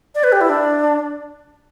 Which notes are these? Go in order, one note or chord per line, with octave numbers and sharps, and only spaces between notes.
D5
B4
G4
E4
D4